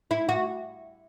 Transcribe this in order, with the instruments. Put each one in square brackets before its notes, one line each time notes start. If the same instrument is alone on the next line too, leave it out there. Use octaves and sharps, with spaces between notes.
[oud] E4
F#4